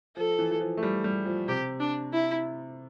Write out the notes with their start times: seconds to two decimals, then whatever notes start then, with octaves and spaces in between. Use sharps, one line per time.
0.16 F3 A4
0.39 E3
0.51 E3
0.61 F3
0.77 A3
0.83 G3
1.04 G3
1.26 F3
1.48 C3 G4
1.80 D4
2.13 E4